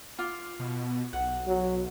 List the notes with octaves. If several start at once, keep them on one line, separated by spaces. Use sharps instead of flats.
F4 D6
B2
B1 F#5
F#3